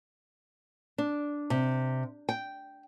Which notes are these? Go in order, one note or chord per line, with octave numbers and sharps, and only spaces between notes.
D4
C3
G5